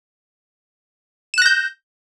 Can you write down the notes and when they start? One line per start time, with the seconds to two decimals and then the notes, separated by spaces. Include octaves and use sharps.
1.34 E7
1.38 F#6
1.42 A#6
1.46 G6